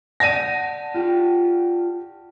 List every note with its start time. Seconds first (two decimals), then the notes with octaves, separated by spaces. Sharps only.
0.20 D5 F#5 A5 A#6 D#7
0.95 F4 G4